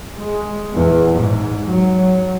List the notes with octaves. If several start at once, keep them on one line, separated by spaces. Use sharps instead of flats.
G#3
E2
G#2
F#3